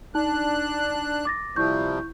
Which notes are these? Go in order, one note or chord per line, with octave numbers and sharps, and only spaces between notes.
D4 D#4 A5 F#6
D6 A6 A#6
C3 F3 G3 E4 C#6 G6